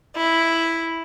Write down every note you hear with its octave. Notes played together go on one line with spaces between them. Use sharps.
E4